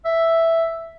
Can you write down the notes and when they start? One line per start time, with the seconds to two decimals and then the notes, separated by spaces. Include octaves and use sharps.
0.05 E5